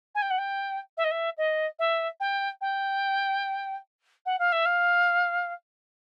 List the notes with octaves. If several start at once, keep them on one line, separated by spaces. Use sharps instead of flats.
G#5
G5
F#5
G5
E5
D#5
E5
D#5
E5
G5
G5
F#5
F5
E5
F5